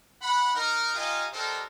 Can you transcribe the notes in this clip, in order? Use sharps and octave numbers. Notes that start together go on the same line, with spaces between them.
F#5 B5
D#4 A#4
D#4 F4 G4 D#5 F5 G#5
D4 D#4 G4 A4 A#4 C5